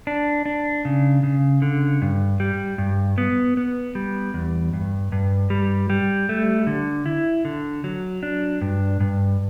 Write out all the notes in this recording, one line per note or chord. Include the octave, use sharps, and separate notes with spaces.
D4
D4
C#3
C#3
D3
G2
G3
G2
B3
B3
G3
E2
G2
G2
G3
G3
A3
D3
E4
D3
F#3
D4
G2
G2